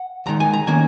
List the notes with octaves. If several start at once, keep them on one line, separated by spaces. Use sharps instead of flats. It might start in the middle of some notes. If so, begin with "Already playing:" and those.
Already playing: F#5
D#2 D#3 G#3 A#5
G#5
A#5
D#3 A#3 C#4 G#5